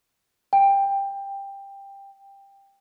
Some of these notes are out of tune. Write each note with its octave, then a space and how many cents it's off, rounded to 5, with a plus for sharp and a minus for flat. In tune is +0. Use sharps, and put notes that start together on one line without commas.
G5 +15